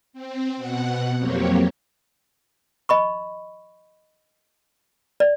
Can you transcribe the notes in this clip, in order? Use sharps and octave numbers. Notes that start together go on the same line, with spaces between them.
C4
B2 F#5
F2 F#3 A#3 C4 G4 C#5
D#5 B5 C#6
D5